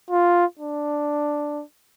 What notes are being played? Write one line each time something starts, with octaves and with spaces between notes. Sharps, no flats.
F4
D4